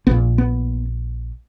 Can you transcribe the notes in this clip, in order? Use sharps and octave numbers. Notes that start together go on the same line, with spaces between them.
A#1 A#2 B3
B3